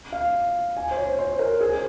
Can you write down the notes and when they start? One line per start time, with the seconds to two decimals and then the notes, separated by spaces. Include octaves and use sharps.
0.13 F5
0.77 G#5
0.91 C5
0.97 C#5
1.19 C5
1.39 A#4
1.61 G#4